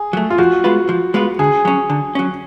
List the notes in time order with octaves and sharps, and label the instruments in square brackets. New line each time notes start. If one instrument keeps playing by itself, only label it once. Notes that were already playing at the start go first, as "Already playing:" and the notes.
Already playing: [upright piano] G#4
[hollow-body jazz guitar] F#3 A3
[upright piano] F4
[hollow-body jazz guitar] F3 [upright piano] F#4
[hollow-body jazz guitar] G#3 B3 F4 B4
F3
G#3 B3 F4 B4
[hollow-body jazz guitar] D3 [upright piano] G#4
[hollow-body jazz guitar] F#3 C#4
D3
F#3 C#4